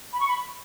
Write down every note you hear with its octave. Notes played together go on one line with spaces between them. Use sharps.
B5
C#6
B5